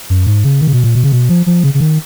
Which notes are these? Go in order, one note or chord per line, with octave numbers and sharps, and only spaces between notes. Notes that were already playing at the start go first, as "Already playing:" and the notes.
F#2
G#2
C#3
D#3
C#3
B2
A#2
B2
C#3
B2
F3
F3
C#3
C#3
D#3